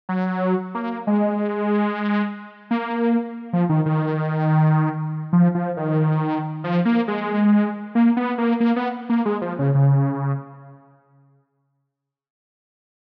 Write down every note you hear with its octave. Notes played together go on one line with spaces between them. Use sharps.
F#3
A#3
G#3
A#3
F3
D#3
D#3
F3
F3
D#3
F3
A#3
G#3
A#3
B3
A#3
A#3
B3
A#3
G#3
F3
C#3
C#3